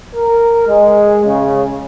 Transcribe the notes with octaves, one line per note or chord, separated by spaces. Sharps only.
A#4
G#3
C#3